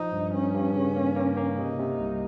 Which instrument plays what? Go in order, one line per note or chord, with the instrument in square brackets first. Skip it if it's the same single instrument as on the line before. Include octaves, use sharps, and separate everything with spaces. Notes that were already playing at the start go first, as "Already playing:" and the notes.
Already playing: [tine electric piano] F3 [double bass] D#4
[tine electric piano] G2
[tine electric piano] G2 [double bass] C#4
[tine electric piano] G2
C#3
A#3
A#3
A#3
[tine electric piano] C3 [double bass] D#4
[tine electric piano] C3
C2